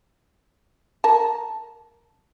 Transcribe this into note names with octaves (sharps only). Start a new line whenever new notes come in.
A#4 A5